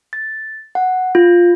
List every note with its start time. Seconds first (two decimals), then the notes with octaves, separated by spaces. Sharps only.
0.13 A6
0.75 F#5
1.15 F4